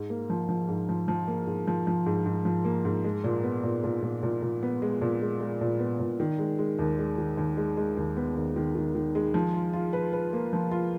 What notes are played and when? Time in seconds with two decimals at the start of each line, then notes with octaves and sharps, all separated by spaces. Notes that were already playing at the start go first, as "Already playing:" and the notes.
Already playing: G#2
0.10 A#3
0.30 F3
0.49 F3
0.68 G#2
0.89 F3
1.08 F3
1.28 A#3
1.47 G#2
1.67 F3
1.87 F3
2.06 G#2
2.26 G#2
2.45 F3
2.65 A#3
2.85 G#2
3.04 G#3
3.24 A#2
3.43 B3
3.64 A#2
3.84 A#2
4.03 A#2
4.23 A#2
4.42 A#2
4.63 B3
4.82 G#3
5.01 A#2
5.22 G#3
5.40 G#3
5.61 A#2
5.79 B3
5.99 A#2
6.20 D#3
6.39 G#3
6.59 G#3
6.79 D#2
6.99 G#3
7.18 D#3
7.37 D#2
7.57 G#3
7.77 G#3
7.97 D#2
8.17 B3
8.36 D#2
8.56 D#3
8.75 D#3
8.95 D#3
9.15 G#3
9.34 F3
9.54 F4
9.73 F4
9.93 B4
10.13 B4
10.33 A#3
10.53 F3
10.71 F4